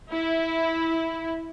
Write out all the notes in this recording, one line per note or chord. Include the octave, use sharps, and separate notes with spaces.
E4